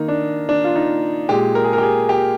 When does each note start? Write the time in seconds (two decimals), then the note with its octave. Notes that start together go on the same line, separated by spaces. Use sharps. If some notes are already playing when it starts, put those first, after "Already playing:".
Already playing: D#3 A#3 D#4
0.08 D4
0.49 D4
0.64 F4
0.75 D#4
1.29 A#2 G#3 G4
1.55 A#4
1.64 G#4
1.73 A#4
1.78 G4
1.83 G#4
2.09 G4